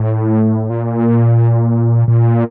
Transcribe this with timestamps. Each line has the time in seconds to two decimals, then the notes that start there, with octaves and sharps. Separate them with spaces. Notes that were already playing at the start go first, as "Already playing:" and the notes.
Already playing: A2
0.70 A#2
2.08 A#2